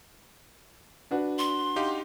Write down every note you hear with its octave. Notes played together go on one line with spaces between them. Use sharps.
D4 F#4 B4
C6
D#4 G4 F5